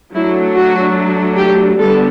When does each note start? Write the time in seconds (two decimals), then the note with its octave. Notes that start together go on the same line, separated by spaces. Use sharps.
0.14 F#3 A3 D4 E4
0.55 F#4
1.37 G4
1.78 D3 G3 B3 D4 A4